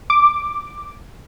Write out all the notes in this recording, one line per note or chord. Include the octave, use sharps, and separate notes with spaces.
D6